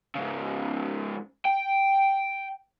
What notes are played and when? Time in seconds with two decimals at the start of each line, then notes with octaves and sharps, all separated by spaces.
0.15 G#2 C#3
1.45 G5